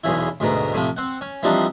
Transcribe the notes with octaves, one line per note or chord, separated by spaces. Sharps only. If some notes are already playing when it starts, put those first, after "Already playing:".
B1 E2 C#3 E4
D2 G#2 B2 A#5
A2 C3 F3
C4 F#5
C#4
E3 F3 G3 C4 D4 D#4